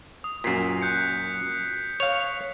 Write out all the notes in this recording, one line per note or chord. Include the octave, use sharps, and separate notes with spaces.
D#6
F#2 A#2 B6 C7
F#6 G6 C#7
C#5 F5